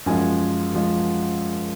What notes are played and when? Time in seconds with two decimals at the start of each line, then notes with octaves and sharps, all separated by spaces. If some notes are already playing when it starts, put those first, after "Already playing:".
0.06 F#2 F3 G#3 G#5
0.74 F3 G#3